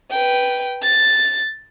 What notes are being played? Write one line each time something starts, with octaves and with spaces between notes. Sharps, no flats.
B4 G5
A6